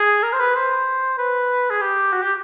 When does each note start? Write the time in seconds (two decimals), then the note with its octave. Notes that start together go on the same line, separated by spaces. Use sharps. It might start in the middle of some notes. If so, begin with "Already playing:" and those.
Already playing: G#4
0.23 A#4
0.33 C5
0.39 B4
0.55 C5
1.18 B4
1.70 G#4
1.81 G4
2.13 F#4
2.23 G4